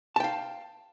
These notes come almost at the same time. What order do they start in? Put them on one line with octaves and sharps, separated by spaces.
A5 G5 F5